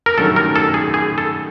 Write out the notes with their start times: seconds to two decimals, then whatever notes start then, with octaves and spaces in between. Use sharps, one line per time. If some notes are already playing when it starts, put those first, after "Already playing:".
0.06 A#4
0.18 G2 D#3 F#3 A3 C#4 A4
0.36 A#4
0.56 A4
0.74 G#4
0.94 G#4
1.18 A4